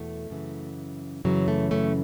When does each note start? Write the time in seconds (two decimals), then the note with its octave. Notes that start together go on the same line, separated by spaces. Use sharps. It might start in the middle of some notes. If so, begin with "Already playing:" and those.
Already playing: E2 B2 A3
0.30 F#2 C#3 E3
1.25 F#2 C#3 E3 F#3
1.48 A3
1.71 A3 C#4